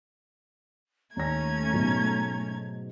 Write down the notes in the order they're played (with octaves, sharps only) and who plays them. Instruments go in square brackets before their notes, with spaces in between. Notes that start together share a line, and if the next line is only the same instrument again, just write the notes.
[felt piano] D#2 A#6 [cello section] A3 [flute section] C#4 A#5 [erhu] G#6
[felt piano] G#2 B2 F#3